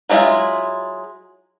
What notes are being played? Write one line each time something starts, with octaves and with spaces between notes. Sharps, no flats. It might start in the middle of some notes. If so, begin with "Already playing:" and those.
F#3 G#3 D4 E4 F4